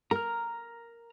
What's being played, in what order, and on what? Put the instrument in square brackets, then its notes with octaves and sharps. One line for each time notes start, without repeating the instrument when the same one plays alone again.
[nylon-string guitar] A#4 [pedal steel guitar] A#5 F6